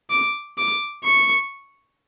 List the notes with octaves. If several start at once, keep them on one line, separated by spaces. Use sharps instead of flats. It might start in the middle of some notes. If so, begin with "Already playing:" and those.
D6
D6
C#6